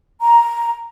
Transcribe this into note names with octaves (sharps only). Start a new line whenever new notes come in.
A#5